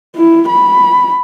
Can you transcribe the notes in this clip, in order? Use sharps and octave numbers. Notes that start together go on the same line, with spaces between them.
E4
B5